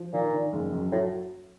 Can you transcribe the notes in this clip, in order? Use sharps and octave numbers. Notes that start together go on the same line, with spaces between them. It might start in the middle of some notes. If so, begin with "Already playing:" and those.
Already playing: F3
A#2 D#3
D#3
F#1
F#2
A2 F#3